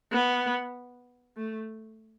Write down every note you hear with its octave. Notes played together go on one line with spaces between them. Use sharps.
B3
A3